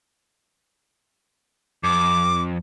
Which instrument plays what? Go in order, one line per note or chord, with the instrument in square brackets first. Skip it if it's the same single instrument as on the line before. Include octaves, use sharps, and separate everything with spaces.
[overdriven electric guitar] F2 [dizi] D6